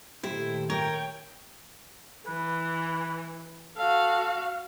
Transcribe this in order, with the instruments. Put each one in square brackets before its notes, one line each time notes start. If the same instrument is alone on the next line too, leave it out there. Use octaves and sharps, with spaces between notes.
[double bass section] A#2 D#3 A3 [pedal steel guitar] E4 [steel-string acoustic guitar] G4 C5
[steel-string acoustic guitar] A#4 [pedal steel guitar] C#5 [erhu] G5
[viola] E3 [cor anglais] B4
[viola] F#4 F5 [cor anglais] A4